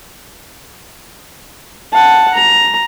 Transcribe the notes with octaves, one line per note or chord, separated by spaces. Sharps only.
F#5 A5
A#5